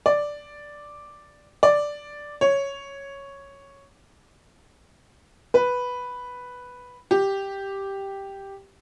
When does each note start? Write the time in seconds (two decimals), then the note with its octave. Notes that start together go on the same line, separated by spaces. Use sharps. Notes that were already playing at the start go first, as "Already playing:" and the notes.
0.06 D5
1.63 D5
2.41 C#5
5.54 B4
7.11 G4